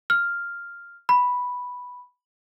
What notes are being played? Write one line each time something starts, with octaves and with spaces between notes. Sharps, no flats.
F6
B5